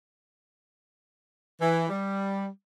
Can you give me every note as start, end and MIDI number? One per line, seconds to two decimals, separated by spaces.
1.60 1.85 52
1.89 2.46 55